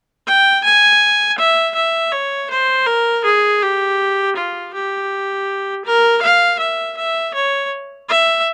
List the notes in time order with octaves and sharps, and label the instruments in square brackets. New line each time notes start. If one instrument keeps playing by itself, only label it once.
[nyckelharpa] G5
G#5
E5
E5
C#5
C5
A#4
G#4
G4
F4
G4
A#4
F5
E5
E5
C#5
E5